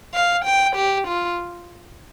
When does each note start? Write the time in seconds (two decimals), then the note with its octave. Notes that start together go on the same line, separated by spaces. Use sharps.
0.14 F5
0.45 G5
0.76 G4
1.07 F4